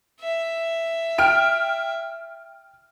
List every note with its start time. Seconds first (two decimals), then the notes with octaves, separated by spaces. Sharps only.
0.21 E5
1.18 G5 F6 D7